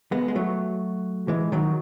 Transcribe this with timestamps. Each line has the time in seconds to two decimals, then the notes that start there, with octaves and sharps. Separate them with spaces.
0.12 G#3 B3
0.28 G#3
0.35 F#3 A3
1.28 E3 G#3
1.52 D#3 F#3